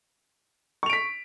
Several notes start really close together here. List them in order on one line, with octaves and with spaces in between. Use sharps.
C#6 F7 D7 B6